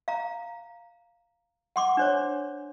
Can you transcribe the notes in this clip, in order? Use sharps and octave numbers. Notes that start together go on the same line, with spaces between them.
F5 A#5
F#5 C6 D6
D4 C5 C#5